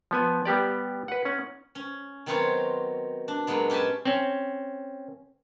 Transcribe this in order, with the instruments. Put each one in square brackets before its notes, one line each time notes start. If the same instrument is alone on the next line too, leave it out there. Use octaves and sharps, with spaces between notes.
[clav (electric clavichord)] F3 B3 G#5
G3 B3 G4 D5
B4 F#5
C#4 F#5
[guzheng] C#4
D#3 F#3 B3 C4 F4 C#5
D4
A#2 F#3 G#3 B3
C#4 G4 B4 G#5 A5
[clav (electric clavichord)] C4 C#4